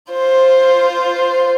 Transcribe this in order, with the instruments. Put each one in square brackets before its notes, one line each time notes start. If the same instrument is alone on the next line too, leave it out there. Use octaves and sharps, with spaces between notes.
[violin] F4 C5